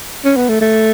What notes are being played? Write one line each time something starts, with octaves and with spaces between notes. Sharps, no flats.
C#4
B3
A3
A3